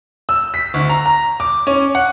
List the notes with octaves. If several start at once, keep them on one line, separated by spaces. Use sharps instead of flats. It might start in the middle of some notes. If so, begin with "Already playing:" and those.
E6
B6
D2
A#5
A#5
D6
C#4
F#5